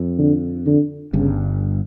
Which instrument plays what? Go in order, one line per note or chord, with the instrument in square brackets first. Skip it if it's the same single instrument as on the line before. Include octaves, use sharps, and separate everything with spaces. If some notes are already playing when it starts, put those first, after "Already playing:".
Already playing: [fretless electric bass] F2
[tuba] D3
D3
[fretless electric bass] G1 G2 [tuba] C#3